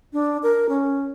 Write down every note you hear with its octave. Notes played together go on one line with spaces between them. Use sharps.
D4
A#4
C#4